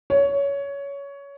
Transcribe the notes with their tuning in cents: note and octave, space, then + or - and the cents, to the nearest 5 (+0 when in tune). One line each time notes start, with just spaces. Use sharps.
C#5 +15